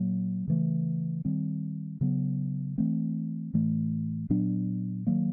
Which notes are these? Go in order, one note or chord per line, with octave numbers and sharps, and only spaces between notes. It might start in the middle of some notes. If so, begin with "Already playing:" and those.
Already playing: A#2 F#3 A#3
C#3 E3 A3
D#3 G3 C4
C#3 F#3 B3
E3 A3 C4
A2 E3 A3
A#2 F#3 B3 D4
D#3 F#3 A#3